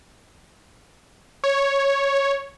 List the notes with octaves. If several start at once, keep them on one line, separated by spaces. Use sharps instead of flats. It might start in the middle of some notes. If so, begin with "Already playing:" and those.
C#5